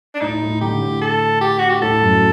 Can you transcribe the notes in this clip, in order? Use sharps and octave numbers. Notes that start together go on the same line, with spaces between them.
D4
A2 D#4
A2
D3 G4
A2
A4
G4
F#4
G4
A2 A4
F#2